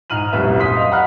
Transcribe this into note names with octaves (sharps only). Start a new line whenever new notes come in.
G#2 F6 D#7 F#7
D#1 C2 F#2 B4 E5
C6 D#6 B6
D#5 F5
F#5 A#5 B5 F6 F#6